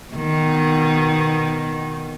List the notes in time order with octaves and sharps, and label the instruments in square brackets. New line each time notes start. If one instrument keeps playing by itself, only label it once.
[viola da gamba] B2 D#3